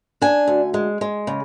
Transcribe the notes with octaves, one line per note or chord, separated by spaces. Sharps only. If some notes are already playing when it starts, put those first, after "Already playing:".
D4 G#5
D2
G#3
G#3
C#3